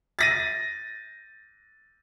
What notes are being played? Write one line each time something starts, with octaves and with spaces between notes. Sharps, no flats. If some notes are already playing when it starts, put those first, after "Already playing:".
A6 A#6 D#7